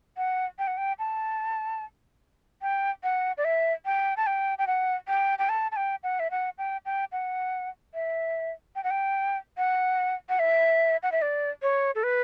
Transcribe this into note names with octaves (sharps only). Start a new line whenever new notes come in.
F#5
G5
F#5
G5
A5
G5
F#5
D5
E5
G5
A5
G5
G5
F#5
G5
G5
A5
A5
G5
F#5
E5
F#5
G5
G5
F#5
E5
G5
F#5
G5
F#5
F#5
E5
F#5
E5
D5
C#5
A4
B4